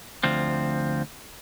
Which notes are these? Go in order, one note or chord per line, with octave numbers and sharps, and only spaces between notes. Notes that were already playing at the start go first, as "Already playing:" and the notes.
D2 F3 C4